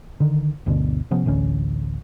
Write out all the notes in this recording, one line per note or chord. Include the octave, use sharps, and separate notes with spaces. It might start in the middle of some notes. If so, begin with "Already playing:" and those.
D3 D#3
G1 D2 B2 D3
C3 F3 B3 C#4
A1 D2 C#4